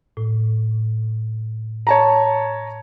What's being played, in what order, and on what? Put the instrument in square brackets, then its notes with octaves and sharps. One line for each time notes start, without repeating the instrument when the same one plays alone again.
[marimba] A2
[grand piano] C#5 A5 A#5